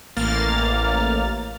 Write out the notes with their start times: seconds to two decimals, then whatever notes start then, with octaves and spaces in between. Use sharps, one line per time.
0.17 A1 A#3 F6 A6